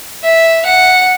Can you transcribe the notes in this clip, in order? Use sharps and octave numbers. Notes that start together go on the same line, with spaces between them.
E5
F#5